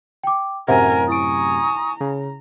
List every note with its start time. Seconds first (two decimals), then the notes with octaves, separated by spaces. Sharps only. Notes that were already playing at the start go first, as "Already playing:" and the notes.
0.23 G5 D6
0.68 F#2 A2 C3 A#4 C5 E5 F#5 G#5
1.09 E4 G#5 A#5 C#6 D#6 D7
2.01 C#3